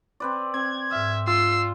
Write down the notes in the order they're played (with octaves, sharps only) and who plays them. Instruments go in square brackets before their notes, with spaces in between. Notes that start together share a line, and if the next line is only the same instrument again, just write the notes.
[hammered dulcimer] C4 B4 D5
[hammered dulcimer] C4 [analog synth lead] G#6
[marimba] G#2 F6 [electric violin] E5
[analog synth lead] F4 [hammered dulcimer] C6 [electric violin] E6 C7